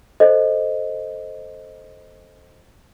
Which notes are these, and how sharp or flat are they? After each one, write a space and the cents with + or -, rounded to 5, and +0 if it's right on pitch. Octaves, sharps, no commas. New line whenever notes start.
A4 +0 C5 +0 D#5 +0